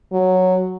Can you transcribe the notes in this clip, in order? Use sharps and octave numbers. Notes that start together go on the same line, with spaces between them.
F#3